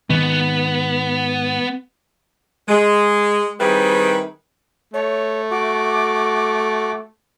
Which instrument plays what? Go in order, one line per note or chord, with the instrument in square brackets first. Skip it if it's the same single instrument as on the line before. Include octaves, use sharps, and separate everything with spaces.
[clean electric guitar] G#2 D#3 [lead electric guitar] B3
[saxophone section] G#3
D#3 G3 C4 E4 G#4 B4
[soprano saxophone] A3 [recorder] C#5
[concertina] F#4 [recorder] D6